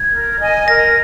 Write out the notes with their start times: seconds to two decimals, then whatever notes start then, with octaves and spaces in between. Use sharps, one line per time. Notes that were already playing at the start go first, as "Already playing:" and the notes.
Already playing: G#6
0.11 A#4
0.40 D#5 G#5
0.68 A#4 A#6